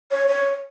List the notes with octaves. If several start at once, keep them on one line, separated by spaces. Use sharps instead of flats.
C#5
C#5